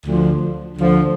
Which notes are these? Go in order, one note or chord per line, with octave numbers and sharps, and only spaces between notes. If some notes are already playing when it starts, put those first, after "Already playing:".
D2 D3 F3
D2 D3 F3